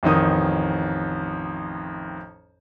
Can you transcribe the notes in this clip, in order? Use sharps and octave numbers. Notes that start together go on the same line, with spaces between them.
A1 F2 D#3 D#6